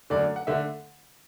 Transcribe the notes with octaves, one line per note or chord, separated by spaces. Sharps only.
F#2 D3 A3 D5
F#5
D3 A3 E5